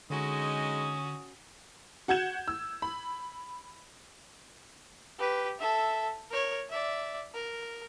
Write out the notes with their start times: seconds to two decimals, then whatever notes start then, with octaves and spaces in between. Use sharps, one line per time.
0.10 D3 G#3 C#4 D#4 F#4 D#6
2.08 F#4 F#5 G6 G#6 E7
2.48 E6
2.82 B5
5.19 G4 B4
5.59 A4 E5
6.31 A#4 C#5
6.70 D5 E5
7.34 A#4